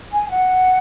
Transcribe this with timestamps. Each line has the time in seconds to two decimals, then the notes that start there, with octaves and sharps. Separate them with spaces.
0.12 G#5
0.29 F#5